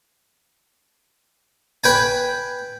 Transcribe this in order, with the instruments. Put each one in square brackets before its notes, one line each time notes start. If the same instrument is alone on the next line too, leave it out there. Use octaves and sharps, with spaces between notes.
[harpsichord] B4 G5 G#5